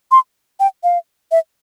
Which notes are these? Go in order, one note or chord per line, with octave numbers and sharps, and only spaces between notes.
C6
G5
F5
E5